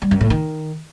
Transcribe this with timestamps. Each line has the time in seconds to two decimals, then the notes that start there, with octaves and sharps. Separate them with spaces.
0.02 G3
0.11 F#2
0.21 A2
0.30 D#3